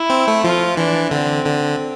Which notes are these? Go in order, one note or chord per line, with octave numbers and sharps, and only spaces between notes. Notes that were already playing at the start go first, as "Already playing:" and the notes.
Already playing: E4
C4
A3
F3 F4
E3 D4
D3 C4
D3